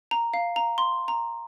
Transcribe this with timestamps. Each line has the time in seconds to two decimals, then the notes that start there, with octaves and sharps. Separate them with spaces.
0.11 A#5
0.34 F5
0.56 A#5
0.78 C6
1.08 A#5